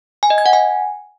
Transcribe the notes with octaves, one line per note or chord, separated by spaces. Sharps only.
G#5
D#5
G#6
F#5
G#5